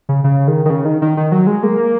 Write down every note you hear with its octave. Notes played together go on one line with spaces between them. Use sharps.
C#3
C#3
D#3
D#3
C#3
D#3
D#3
D#3
F#3
G#3
A#3